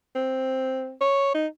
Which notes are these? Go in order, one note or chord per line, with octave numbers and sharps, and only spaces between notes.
C4
C#5
D#4